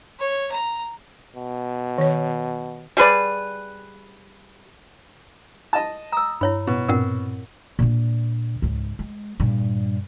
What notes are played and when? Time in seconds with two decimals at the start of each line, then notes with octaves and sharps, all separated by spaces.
0.19 C#5
0.52 A#5
1.36 B2
1.98 D#3 C#5
2.97 G3 G#4 B4 D5
5.73 D#5 A5
6.12 A#5 D#6 E6
6.41 G2 E4 C#5 B5
6.67 B2
6.88 G2 A#2 C4 A#4 F#5
7.79 A#2 D4
8.62 C#2 G#2
8.99 G#3
9.40 G2 A#2